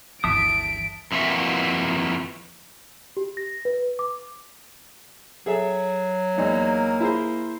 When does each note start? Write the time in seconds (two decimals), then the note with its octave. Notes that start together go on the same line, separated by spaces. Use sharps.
0.24 G1 D2 E3 E5 A5 D#6 D7
1.12 F2 E3 A#3 F#4 E5
3.17 G4
3.37 A#6
3.65 B4
3.99 D6
5.46 F#3 G#4 A4 E5
6.37 E2 A#3 D#4
7.00 E4 G#4 C5